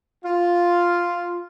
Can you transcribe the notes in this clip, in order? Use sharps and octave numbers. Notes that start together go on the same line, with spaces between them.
F4